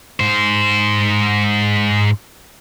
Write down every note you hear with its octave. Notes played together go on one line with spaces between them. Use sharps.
G#2 C5